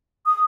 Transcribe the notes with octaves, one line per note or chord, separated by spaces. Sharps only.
D#6